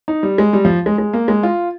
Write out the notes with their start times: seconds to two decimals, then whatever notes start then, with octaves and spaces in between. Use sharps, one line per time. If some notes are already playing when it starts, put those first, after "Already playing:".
0.08 D#4
0.23 G3
0.38 G#3
0.53 G3
0.65 F3
0.86 G#3
0.98 G#3
1.13 A#3
1.28 G#3
1.43 F4